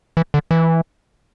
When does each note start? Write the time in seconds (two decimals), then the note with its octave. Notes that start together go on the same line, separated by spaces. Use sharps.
0.17 E3
0.34 D3
0.51 E3